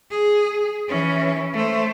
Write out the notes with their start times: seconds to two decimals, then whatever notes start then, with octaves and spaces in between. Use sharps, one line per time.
0.11 G#4
0.88 E3 C#4
1.53 A3 C5